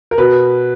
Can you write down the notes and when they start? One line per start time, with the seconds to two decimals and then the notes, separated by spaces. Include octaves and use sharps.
0.11 A#4
0.18 B2 B4